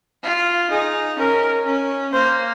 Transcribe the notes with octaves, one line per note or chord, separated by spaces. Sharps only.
F4
D#4 G#4
C#4 A#4
C#4
A#3 C5